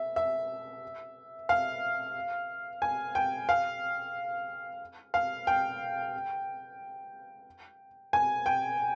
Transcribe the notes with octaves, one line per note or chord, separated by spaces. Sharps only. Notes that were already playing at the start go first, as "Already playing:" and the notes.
Already playing: E5
E5
F5
G#5
G5
F5
F5
G5
G#5
G5